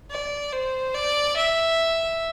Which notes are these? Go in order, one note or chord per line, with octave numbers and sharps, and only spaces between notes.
D5
C5
D5
E5